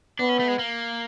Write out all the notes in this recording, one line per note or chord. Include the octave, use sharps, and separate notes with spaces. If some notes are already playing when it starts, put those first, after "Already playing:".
B3 D4
C#4
A3
G#3
A#3